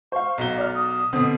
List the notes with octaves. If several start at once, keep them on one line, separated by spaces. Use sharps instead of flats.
C5 F5 C#6
B1 F#3 D#5 G7
D5 F6
D#6
B2 D3 C4